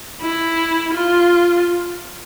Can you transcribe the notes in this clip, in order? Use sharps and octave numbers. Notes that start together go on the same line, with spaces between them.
E4
F4